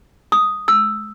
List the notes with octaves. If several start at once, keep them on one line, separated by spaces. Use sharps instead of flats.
D#6
E6